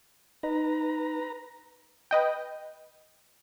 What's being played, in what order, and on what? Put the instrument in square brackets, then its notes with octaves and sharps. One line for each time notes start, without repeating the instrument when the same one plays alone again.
[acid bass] D#4 [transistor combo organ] B4 A#5
[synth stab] B4 D#5 G5